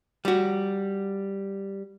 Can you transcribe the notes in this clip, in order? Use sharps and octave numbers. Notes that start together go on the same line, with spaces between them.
G3 F#4